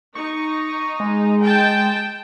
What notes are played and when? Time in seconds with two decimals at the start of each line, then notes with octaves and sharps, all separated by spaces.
0.15 D#4 C#6
1.00 G#3
1.43 G5 A5